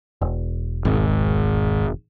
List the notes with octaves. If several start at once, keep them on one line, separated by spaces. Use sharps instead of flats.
E1
G#1